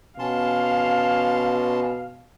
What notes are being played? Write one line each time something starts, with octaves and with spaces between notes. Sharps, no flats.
B2 C#4 F5 A5 C6